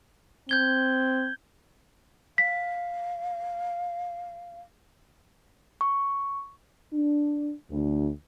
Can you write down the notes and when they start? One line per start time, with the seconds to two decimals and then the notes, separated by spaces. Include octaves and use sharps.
0.49 C4 G6 G#6 G7
2.38 F5 B6
5.81 C#6
6.94 D4
7.71 D2